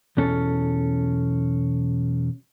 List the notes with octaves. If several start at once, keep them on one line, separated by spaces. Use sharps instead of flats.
B1 E2 C#4 A4